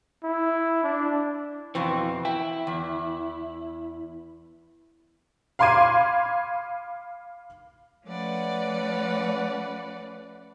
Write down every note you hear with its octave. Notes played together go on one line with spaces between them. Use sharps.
E4
D4
F2 B2 E3 C4
E4 G5
E2
F5 B5 C6 D6 G#6 D#7
F3 A3 C#4 B4 D5 F#5